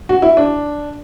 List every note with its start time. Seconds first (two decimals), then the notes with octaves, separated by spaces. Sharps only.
0.09 F#4
0.22 E4
0.37 D4